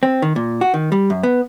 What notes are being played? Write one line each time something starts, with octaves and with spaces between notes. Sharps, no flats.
C4
D#3
A#2
F#4
D#3
G3
F#2
B3